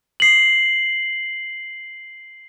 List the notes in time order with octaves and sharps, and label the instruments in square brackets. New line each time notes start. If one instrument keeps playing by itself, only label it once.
[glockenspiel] C7 F#7